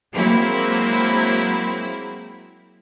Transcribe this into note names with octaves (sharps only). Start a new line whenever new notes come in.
F#3 G#3 A#3 C4 E4